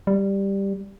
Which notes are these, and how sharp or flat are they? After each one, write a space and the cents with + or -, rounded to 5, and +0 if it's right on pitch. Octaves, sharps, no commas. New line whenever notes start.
G3 +5